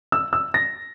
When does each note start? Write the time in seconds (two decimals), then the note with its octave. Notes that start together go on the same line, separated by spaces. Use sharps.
0.12 E6
0.33 E6
0.54 A#6